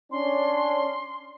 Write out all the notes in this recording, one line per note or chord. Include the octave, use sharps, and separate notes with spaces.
C#4 D4 C6